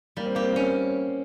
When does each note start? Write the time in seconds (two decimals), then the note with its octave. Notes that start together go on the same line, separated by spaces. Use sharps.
0.17 G3 A#3
0.26 C4
0.35 A#3 G4
0.43 C4
0.52 A#3 C#4